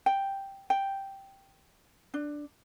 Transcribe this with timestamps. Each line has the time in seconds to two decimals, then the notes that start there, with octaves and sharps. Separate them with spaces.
0.06 G5
0.70 G5
2.14 D4